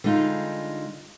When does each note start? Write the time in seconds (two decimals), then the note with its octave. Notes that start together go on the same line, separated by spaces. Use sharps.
0.04 D3 G3 G#3 D#4 F4